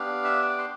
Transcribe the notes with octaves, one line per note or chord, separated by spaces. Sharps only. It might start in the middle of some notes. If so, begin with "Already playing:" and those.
Already playing: B3 D4 G4 F5
E5
D6
C6